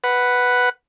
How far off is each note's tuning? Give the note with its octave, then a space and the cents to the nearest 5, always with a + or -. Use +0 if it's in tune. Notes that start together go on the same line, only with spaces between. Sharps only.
B4 +0 F#5 +0